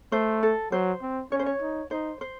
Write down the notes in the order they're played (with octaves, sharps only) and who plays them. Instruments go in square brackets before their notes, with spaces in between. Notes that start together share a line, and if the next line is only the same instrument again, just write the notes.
[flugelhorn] A3 [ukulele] C5
[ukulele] A4
[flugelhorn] F#3 [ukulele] C5
[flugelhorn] C4
[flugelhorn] C#4 [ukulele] C#5
[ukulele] C5
C#5
[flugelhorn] D#4
[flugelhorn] D#4 [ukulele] C5
[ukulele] C5